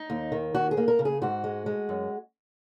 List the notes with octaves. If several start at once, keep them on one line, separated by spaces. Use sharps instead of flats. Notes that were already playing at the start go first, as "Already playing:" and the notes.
Already playing: D#4
D#2
D#3
D#2 F#4
G#4
A#3
A#4
C#3
G#4
G#2 F#4
G#3
G#3
F#2